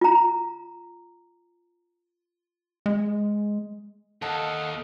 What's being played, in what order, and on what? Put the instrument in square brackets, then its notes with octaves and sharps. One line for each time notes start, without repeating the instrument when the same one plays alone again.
[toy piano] F4 A#5
[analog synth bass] G#3
[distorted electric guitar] D#2 [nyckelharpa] A4 F5 [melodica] D#5 F#5 [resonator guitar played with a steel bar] A5